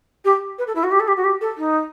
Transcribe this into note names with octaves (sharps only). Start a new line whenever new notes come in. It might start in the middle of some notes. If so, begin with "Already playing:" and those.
G4
B4
A4
E4
F#4
G4
A4
G4
F#4
G4
A4
D#4